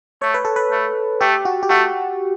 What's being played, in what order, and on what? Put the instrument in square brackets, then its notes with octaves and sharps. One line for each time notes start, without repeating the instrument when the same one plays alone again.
[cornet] A3 [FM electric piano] C#5
[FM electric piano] B4
A4
B4
[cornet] A3
[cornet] A3 [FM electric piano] G4
[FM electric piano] F#4
G4
[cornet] A3 [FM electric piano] F#4